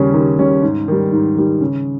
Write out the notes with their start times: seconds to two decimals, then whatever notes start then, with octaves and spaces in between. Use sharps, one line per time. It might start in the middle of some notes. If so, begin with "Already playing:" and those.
Already playing: D#2 C#3 G3 C#4
0.14 D#2
0.38 C#3 G3 C#4
0.62 G#2
0.88 D#3 G3
1.12 G#2
1.37 D#3 G3
1.61 C#3